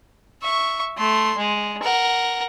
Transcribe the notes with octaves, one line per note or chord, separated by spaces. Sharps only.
E5 C#6
A3 C6
G#3
A#4 F#5